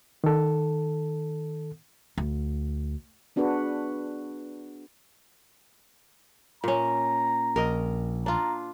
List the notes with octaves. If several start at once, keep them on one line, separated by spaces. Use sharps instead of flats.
D#3 A4
D2
B3 D4 F#4 G#4 B4
A#2 C#4 A#5
A#1 A#4 D#5
D4 F4 A#5